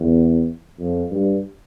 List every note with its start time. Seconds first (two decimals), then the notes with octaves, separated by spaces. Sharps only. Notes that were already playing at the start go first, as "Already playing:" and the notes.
Already playing: E2
0.80 F2
1.11 G2